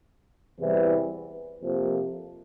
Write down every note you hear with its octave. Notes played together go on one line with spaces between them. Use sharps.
E2 C3 E3 G3
F2 C3 F3 A#3